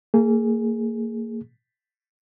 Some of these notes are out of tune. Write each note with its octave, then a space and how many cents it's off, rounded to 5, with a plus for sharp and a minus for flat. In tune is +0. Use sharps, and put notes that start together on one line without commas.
A#3 -30 G#4 +0